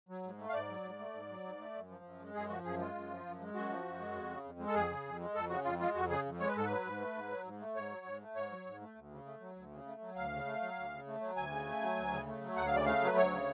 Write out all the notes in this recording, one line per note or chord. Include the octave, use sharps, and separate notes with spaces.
F#3
G#2
A3
F5
G#2 D5
F#3
G#2
A3
G#2
F#3
G#2
A3
F#2
F3
F#2
G#3
F#2 G#4
F3 F#4
F#2 G#4
G#3 F4
F#2
F3
F#2
G#3
F#2 F#4
F3
F#2
G#3
F2
C#3
F2
G#3
A4
F2 G#4
C#3
F2
G#3
F2 A4
C#3 F#4
F2 F4
G#3 F4
F2 F#4
C#3 G#4
F2
G#3 C#5
B4
G#2 A4
B4
F#3
G#2
A3
G#2
F#3
G#2
A3
G#2 C#5
F#3
G#2
A3
G#2 C#5
F#3
G#2
A3
D2
C#3
A3
F#3
D2
C#3
A3
F#3
D2 F5
C#3
A3
F#3
D2
C#3
A3
F#3
D2 G#5
C#3
A3
F#3
D2
C#3
A3
F#3
D2 F#5
F5
C#3 D5
A3 F5
F#3
B4
D2 C#5
C#3